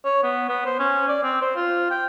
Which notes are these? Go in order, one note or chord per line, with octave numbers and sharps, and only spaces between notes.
C#5
B3
B3
C5
C#4
D5
C4
C5
F4
G5